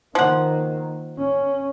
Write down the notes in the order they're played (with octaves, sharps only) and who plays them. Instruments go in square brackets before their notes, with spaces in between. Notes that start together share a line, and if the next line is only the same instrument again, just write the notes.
[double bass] D#3 A#3 [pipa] F3 F#5
[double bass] C#4